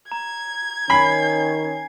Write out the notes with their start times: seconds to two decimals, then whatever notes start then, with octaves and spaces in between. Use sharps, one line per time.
0.12 A#5 G#6
0.90 D#3 C#4 G#5 B5 C7